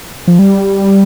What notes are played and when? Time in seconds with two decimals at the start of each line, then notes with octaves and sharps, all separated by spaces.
0.28 F3
0.39 G3